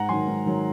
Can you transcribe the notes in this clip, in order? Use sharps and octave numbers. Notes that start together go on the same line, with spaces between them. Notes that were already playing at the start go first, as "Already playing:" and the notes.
Already playing: G#2 F#5 A#5
D#3 F#3 G#5 C6
G#2
D#3 F#3